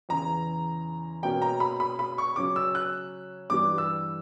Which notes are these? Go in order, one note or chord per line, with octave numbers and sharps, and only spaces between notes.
E2 C#3 E3 A#5
B2 A#3 C#4 G5
A#5
B5
B5
B5
C#6
C#3 F#3 C#4 D6
E6
F#6
G2 E3 G3 D6
E6